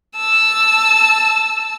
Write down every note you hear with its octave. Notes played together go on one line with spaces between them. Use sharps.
A5 E6